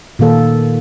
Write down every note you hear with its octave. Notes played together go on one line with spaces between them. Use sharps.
A#2 D#3 A#3 A4